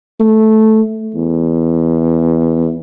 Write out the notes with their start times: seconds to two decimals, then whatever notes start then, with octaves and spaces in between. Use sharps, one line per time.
0.20 A3
1.15 E2